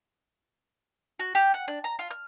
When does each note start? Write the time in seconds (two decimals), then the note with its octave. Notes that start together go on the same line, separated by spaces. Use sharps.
1.19 F#4
1.35 G4
1.54 F#5
1.68 D4
1.84 A#5
1.99 F4
2.11 F6